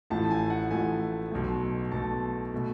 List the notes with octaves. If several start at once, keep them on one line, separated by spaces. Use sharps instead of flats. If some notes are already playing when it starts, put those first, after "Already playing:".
A1 A2 F3 A3 A5
G#5
F#5
A1 A2 F3 A3 G#5
B1 B2 A3
B1 B2 A3 A5
B2 A3